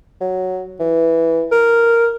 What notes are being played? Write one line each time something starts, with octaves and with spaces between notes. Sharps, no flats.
F#3
E3
A#4